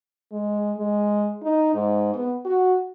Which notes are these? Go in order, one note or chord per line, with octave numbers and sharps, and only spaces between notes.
G#3
G#3
D#4
G#2
B3
F#4